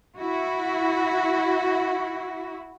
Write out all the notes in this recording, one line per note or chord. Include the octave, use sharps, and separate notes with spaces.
E4 F#4